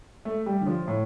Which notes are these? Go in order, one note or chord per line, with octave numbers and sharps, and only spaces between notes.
A3
G3
D3
F3
A2